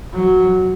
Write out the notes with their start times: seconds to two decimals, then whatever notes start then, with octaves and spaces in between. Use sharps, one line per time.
0.13 F#3